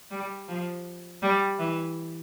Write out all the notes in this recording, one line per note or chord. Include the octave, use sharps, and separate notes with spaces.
G3
F3
G3
E3